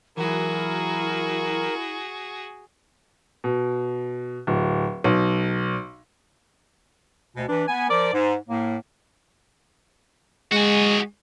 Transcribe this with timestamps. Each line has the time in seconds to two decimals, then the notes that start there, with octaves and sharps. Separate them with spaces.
0.17 E3 F#3 E4 F#4 G#4 A#4
3.44 B2
4.47 D1
5.04 B1
7.36 D2 B2
7.48 E3 D4
7.68 B3 G#5
7.89 F3 A#4 D5
8.13 G#2
8.49 A2 A#3
10.52 G#3 F#4 G#4